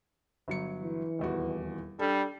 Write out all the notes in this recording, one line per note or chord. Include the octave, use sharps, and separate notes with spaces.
G1 F#3 C#7
E3
D#1 E2 F#4
G3 D4 A4